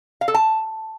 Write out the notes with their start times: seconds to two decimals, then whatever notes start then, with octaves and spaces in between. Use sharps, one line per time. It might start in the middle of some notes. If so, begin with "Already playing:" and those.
0.21 F5
0.28 A4
0.34 A5